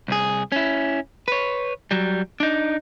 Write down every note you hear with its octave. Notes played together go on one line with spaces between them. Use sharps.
C2 G#4
C#4 E4
B4 C#5
F#3 G3
D4 D#4